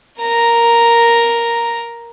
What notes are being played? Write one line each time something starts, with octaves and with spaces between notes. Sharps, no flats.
A#4 A#5